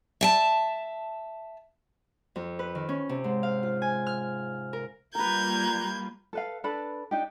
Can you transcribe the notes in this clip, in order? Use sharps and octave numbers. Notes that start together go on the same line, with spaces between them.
E5 G5 A5
F2
B4
D#3
C#4
C3
G#2
F5
F4
G#5
F6
A#4
G3 A#3 F4 A#4 B4 A#5 G6 G#6
A4 B4 F5
D4 A4 B4 B5
D4 D#4 G4